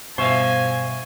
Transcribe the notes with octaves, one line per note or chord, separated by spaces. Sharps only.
G2 B2 C5 E5 F5 G#5 C#6